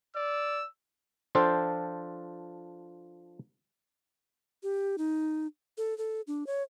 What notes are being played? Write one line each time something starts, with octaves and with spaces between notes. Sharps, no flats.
D5 E6
F3 D4 F4 A4 C5 G5
G4
D#4
A4
A4
D4
C#5